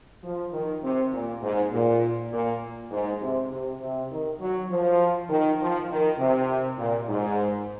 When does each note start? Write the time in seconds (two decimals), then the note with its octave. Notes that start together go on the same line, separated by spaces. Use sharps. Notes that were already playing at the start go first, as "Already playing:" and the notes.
0.24 F3
0.53 D#3
0.83 C3
1.13 A#2
1.42 G#2
1.72 A#2
2.32 A#2
2.91 G#2
3.21 C3
3.51 C3
3.81 C3
4.11 D#3
4.40 F#3
4.70 F3
5.29 D#3
5.59 F3
5.90 D#3
6.18 C3
6.78 A#2
7.08 G#2